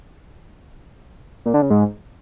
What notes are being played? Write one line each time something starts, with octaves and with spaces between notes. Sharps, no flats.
A#2
D3
C#3
G#2